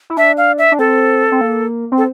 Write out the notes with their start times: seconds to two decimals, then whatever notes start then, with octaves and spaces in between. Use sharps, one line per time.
0.10 E4
0.17 D4 E5
0.37 F5
0.58 E5
0.72 D4
0.79 C4 A4
1.32 C4
1.41 A#3
1.92 C4
1.98 A4